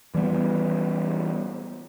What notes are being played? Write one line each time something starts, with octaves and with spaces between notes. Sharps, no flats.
E3 G3 A3 B3